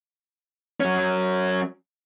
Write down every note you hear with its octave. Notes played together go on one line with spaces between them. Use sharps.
F#3 C#4